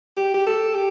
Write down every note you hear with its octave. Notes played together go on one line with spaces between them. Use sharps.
G4
G4
A4
G4